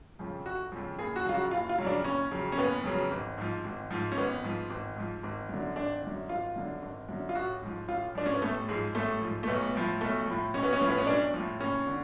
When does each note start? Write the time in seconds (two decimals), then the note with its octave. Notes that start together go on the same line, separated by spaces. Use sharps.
0.19 F2 C#3 F3
0.45 F1 F#4
0.72 F2 C#3 F3
0.98 F#1 G#4
1.16 F#4
1.25 F2 C#3 F#3 F4
1.34 F#4
1.51 F#1 F4
1.69 F4
1.78 F2 C#3 F#3
1.87 D4
2.04 F#1 C#4
2.31 F2 C#3 F#3
2.52 C#4
2.58 F#1 B3
2.84 F2 C#3 F#3
3.11 G#1
3.38 G#2 F3
3.64 G#1
3.91 G#2 F3
4.12 C#4
4.17 G#1 B3
4.43 G#2 F3
4.70 G#1
4.96 G#2 F3
5.23 G#1
5.49 F#2 D3
5.76 G#1 D4
6.02 F#2 D3
6.29 G#1 F4
6.56 F#2 D3
6.82 G#1
7.09 F#2 D3
7.29 F4
7.35 A1 F#4
7.62 G#2 F3
7.88 A1 F4
8.15 G#2 F3 D4
8.26 C#4
8.34 B3
8.42 A1 A3
8.68 G#2 F3 G#3
8.95 A1 A3
9.21 G#2 F3
9.43 A3
9.48 B1 B3
9.75 A2 F3
10.01 B1 A3
10.27 A2 F3
10.54 B1 C#4
10.63 B3
10.73 C#4
10.81 A2 F3
10.90 B3
10.99 C#4
11.07 B1 D4
11.34 A2 F3
11.60 F#1 C#4
11.87 D3